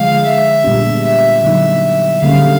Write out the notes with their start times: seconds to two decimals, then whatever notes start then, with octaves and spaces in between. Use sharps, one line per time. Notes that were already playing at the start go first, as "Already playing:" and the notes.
Already playing: D3 F3 G#3 F5
0.24 E5
0.64 A#2 G3 B3 D4 G4
1.04 E5
1.43 D3 F#3 A#3 D#4 E5
2.22 D3 G3 A#3 C#4 F5